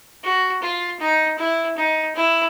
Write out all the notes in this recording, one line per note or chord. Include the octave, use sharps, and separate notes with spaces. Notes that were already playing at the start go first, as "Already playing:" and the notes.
F#4
F4
D#4
E4
D#4
E4